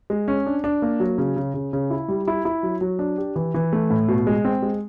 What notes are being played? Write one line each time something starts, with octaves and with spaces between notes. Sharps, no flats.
G#3
C#4
D4
D4
A#3
F#3
C#3
C#3
C#3
C#3
E4
G3
E4
E4
F#3
F#3
D4
G4
E3
E3
A3
A2
B2
G#3
C4
G#3